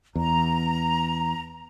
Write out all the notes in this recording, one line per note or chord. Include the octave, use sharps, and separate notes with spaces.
E2 A#5